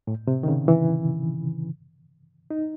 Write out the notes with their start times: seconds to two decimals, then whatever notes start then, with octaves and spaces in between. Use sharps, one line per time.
0.07 A2
0.27 C3
0.43 D#3
0.48 C#3
0.68 E3
2.50 D#4